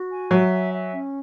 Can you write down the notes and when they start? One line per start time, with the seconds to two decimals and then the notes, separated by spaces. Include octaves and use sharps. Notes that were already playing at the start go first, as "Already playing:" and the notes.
Already playing: F#4
0.10 G#5
0.31 F#3 E5
0.51 G#5
0.73 E5
0.94 C#4